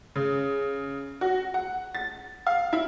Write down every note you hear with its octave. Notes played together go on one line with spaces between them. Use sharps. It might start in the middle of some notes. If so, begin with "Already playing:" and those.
C#3
F#4
F#5
A6
F5
E4